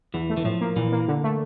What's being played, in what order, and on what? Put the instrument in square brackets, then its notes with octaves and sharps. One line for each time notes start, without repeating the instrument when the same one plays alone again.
[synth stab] E2 [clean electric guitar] E3
[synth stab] A3
[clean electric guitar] E3
[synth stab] A2 [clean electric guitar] F3
[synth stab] A#3
[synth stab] A#2 [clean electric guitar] E3
[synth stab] A#3
D3
A3